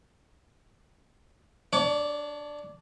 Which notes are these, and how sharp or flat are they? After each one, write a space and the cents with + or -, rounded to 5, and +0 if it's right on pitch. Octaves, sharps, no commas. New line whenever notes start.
D4 +0 C#5 +35 D6 +0